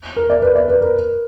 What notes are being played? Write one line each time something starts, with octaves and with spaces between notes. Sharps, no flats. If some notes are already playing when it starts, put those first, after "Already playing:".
A#4
D5
B4
D5
B4
A#4